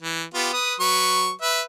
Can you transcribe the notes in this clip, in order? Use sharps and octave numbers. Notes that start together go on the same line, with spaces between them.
E3
B3 F4 G4
B4 D#6
F#3 B4 C#6
B4 E5